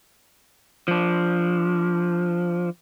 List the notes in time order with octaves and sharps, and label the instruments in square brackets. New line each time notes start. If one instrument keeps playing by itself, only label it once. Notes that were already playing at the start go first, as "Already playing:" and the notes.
[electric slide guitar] F3 D4